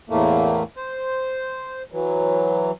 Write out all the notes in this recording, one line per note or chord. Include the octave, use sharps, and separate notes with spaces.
E2 A2 A3 A#3
C5
E3 F#3